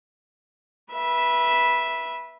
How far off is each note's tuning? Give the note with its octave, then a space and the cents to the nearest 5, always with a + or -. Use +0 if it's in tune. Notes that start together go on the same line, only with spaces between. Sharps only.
B4 -20 E5 +0